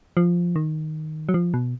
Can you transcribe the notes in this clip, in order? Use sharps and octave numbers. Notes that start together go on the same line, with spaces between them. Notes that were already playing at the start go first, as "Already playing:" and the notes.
F3
D#3
F#3
F3
B2